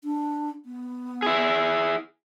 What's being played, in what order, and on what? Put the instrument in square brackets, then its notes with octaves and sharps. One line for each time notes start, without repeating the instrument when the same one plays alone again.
[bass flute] D4
B3
[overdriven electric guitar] E4 G#4